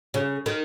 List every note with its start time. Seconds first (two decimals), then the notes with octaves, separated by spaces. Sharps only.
0.14 C#3
0.46 D#3